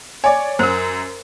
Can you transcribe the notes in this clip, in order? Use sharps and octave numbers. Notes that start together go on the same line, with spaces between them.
C#5 D5 G#5
F#2 A#4 C5